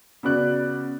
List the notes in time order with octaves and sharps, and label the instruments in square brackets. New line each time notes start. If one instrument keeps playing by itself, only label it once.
[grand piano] C#3 B3 F#4 D5 F#6